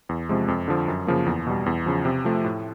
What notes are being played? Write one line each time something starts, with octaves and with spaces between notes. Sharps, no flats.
E2
C3 F3 G#3
F2
D3 F3
F#2
C#3 F3 A#3
E2
B2 G3
E2
C#3 F3
C3
F3 A3
A2